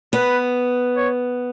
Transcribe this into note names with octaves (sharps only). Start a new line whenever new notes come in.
B3 B4
C#5